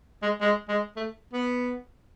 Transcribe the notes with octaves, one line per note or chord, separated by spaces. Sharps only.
G#3
G#3
G#3
A3
B3